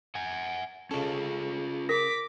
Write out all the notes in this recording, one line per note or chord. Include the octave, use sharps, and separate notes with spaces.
F#5 G#5
C#3 C#4 F4 A4
A#4 D6 A#6 B6